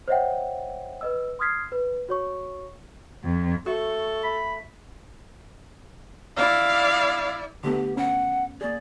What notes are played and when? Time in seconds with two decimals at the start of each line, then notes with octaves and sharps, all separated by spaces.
0.08 C5 C#5 D#5 E5 F#5 G5
1.01 B4 D#5 E6
1.39 C6 D#6 F6 G#6 B6 C7
1.72 B4
2.09 F#4 C#5 C#6
3.24 F2
3.66 A3 F#4 A4 C#6
4.24 A3 B5
6.37 E4 D5 F5
7.64 D3 A3 B3 G4
7.97 C#4 F#5
8.61 A#3 G#4 D5